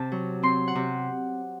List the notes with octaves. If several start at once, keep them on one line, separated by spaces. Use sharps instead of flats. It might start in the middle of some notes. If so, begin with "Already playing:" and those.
Already playing: C3 A5
F#3
C4 C6
F#5
C3